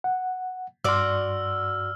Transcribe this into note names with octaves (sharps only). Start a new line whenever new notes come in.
F#5
G2 F#4 D5 C6 E6 F6